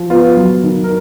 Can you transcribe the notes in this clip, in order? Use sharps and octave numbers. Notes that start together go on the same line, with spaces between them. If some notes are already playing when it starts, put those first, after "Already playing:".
Already playing: F3
B3 F4
F#3
D#3
A#4